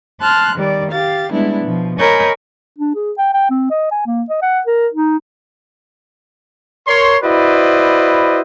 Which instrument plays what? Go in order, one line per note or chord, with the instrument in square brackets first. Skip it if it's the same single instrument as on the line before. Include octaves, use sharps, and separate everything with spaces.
[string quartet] A5 C6 F6 F#6
D#3 G3 D5
G4 F5 A6
G3 G#3 B3 D4 E4
B2 F3
A#4 C#5 D#5 G#5 B5 G6
[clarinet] D4
G#4
G5
G5
C4
D#5
G#5
A#3
D#5
F#5
A#4
D#4
[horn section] A#4 C#5 C6
E4 F#4 B4 C5 D5 D#5